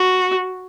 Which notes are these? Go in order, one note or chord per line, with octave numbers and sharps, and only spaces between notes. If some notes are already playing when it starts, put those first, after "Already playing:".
Already playing: F#4